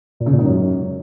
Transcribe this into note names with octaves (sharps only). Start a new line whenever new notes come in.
A#2
C#3
A#2
G#2
F#2